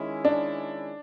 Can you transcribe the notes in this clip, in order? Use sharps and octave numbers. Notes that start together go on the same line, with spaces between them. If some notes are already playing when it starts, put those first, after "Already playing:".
Already playing: D#3 G#3 C#4 E4
D4